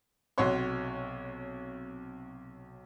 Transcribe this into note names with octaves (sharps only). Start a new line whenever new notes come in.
B1 C3 F#4 C#5 C6